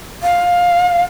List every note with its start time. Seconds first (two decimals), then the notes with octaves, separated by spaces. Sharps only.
0.23 F5